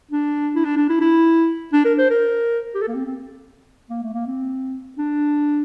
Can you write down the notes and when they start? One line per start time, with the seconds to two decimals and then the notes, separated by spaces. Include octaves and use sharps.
0.11 D4
0.55 E4
0.65 D4
0.77 D4
0.89 E4
1.01 E4
1.73 D4
1.85 A#4
1.98 C5
2.10 A#4
2.74 G4
2.81 A4
2.88 A#3
2.94 C4
3.06 C4
3.90 A#3
4.03 A3
4.14 A#3
4.27 C4
4.98 D4